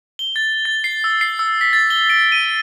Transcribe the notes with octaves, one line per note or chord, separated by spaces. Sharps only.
G7
A6
A6
C7
E6
C7
E6
B6
A6
G7
D7
D#7